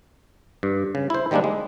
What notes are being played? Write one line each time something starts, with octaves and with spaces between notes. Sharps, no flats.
G2
C#3
E4 C5
D#3 G3 G#3 A#3 C4 D4
G#3